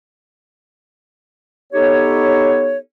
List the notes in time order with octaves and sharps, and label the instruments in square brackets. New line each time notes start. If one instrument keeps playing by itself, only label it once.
[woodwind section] B3 D#4 G4 A4 C#5